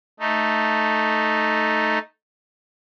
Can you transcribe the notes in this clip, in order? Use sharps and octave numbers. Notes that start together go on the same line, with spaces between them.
A3 D#4